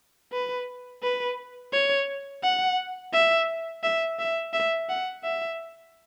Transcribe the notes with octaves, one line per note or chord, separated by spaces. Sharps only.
B4
B4
C#5
F#5
E5
E5
E5
E5
F#5
E5